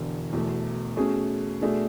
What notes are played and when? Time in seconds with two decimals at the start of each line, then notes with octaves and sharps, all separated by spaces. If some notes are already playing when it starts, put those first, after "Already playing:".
Already playing: E1 E2 D3
0.33 E1 E2 B2 A3
0.97 B2 A3 C#4 G#4
1.61 B2 A3 D4 G#4